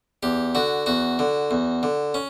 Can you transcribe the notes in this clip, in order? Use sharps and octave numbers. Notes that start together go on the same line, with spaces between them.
E2 G4
D3 F#4
E2 F#4
D3
E2
D3
C#4